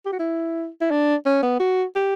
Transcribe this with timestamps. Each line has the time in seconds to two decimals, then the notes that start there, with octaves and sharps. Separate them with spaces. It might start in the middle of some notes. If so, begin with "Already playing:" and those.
0.06 G4
0.13 F#4
0.19 E4
0.81 E4
0.91 D4
1.26 C#4
1.43 B3
1.60 F#4
1.96 G4